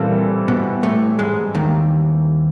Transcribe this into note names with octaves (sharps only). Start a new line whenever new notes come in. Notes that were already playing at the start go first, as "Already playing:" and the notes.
Already playing: A#2 E3 G3 A#3 C4 E4 A4
B2 B3
A2 A3
G#2 G#3
D#2 D#3